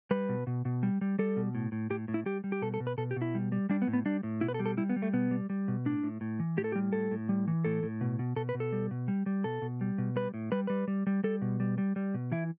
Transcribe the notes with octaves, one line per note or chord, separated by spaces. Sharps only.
G3 B4
B2
B2
B2
G3
G3
G3 A4
B2
A2
A2
A2 G4
A2
E4
G3 G4
G3
G4
B2 A4
A4
B2
B4
B2 A4
G4
B2
E4
G3
G3
G3 D4
B3
A2
B3
G3 D4
A2
B2 E4
B4
A4
G3
A4
G3 E4
B3
G3
A3
B2 B3
G3
G3
B2
A2 D4
A2
A2
E3
A2 G4
A4
G4
G3
A2 A4
A2
G3
E3
A2 A4
A2
B2
B2
B2 A4
B4
B2
A4
G3
B2
G3
G3
B2 A4
B2
G3
B2
G3 B4
A2
G3 B4
G3 B4
G3
G3
G3 A4
B2
G3
G3
G3
B2
E3 E4